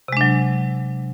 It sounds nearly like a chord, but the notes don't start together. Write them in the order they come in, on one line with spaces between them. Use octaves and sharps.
C3 G#3 D4 F#3